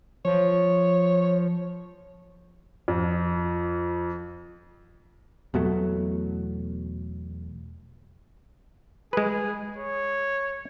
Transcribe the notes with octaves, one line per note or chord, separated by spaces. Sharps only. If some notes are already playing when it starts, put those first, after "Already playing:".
F3 C#5
F2
E2 B2 F#3 A3
G#3 G#4 B4
C#5